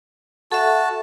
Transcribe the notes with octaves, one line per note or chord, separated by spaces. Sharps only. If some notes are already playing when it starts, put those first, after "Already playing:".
F#4 A4 E5 A5